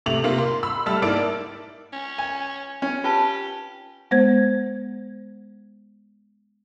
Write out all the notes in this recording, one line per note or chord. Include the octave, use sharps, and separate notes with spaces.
C3 A3 D6 F7 F#7
C3 A#3 F4
C6
B5 E6
G3 A3 A5 E6 F6
G#2 A#3 E4 D5 A5 D7
C#4
G#5
C#4
F4 G4 B4 A5
G#3 B3 C5 G#6